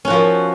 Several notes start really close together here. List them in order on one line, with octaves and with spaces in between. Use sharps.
C#4 F#4 F3 B3